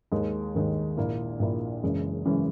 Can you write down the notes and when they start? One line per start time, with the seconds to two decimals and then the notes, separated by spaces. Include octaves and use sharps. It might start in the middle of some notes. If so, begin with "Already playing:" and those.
0.12 D#2 D#3 G#3 D#4
0.55 D#2 D#3 G#3 D#4
0.97 A#1 A#2 A#3 E4
1.39 A#1 A#2 A#3 E4
1.83 F#1 F#2 E3 G#3 C#4
2.25 F#1 F#2 E3 G#3 C#4